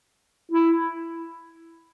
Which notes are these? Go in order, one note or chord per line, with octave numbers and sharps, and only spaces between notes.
E4